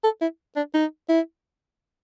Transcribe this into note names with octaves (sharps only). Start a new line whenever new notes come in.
A4
E4
D4
D#4
E4